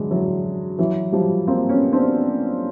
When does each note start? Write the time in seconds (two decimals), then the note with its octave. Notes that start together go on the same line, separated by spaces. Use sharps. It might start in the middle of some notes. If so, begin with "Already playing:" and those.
Already playing: D3 E3 F#3 G#3
0.10 E3 F#3
0.79 E3 F#3
1.12 F3 G3
1.47 A#3 C4
1.69 B3 C#4
1.93 C4 D4